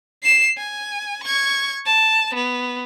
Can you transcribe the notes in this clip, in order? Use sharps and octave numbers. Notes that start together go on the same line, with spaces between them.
C7 E7
G#5
C#6 G#6
A5
B3